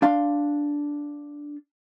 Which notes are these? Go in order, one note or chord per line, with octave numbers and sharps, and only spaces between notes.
D4 F5 C6